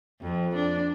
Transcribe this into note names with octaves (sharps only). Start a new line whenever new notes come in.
F2
D4